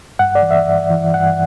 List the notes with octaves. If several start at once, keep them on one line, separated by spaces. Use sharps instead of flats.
G2 F#5
D5
E3
E5
G2
E3
G2 F#5